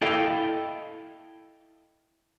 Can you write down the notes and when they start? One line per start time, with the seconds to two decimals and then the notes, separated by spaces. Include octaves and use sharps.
0.01 E4 A4 D#5 F5 G5